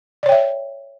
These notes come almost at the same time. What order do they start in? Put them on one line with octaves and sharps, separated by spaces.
D5 C#5 G5 E5